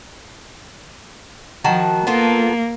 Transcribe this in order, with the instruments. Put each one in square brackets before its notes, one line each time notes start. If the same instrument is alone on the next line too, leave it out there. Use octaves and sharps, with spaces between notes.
[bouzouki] D#3 F#4 A5 [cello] F3
[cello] A#3 [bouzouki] B3 F4 A4